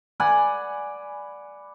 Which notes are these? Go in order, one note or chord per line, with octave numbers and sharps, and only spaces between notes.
D5 F#5 G#5 B5